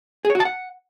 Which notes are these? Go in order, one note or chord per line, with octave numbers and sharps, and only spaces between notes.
G#4
C#5
F#4
A5
F#5